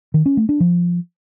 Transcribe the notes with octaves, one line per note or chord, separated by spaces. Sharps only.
D#3
C#4
A3
D4
F3